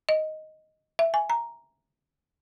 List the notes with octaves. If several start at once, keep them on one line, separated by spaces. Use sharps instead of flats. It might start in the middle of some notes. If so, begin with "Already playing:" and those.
D#5
E5
G#5
A#5